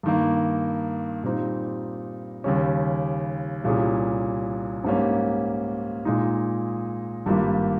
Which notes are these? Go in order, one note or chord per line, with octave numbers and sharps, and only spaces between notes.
G2 D#3 A#3
A#2 G3 C4 D#4
D#2 C#3 G3 C#4
C2 A#2 G3 C#4 G#4
G#2 G3 A#3 C#4
A#2 G#3 D#4
G#1 G2 G3 A#3 F4